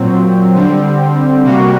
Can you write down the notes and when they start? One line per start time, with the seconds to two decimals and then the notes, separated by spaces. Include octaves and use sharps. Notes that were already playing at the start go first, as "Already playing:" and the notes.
Already playing: A#2 F#3 C4
0.54 D3 G3 C4
1.44 C3 G3 A#3 F#4